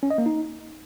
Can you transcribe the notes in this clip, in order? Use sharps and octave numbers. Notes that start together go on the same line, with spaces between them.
C#4
D#5
A#3
D#4